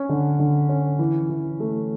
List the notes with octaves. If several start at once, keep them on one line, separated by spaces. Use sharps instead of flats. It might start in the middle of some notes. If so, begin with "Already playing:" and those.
Already playing: C#4
D3
D3
C#4
E3
E3
A3